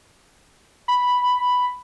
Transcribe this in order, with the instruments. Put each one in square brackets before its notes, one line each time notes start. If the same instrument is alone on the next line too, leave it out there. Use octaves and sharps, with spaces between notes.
[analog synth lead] B5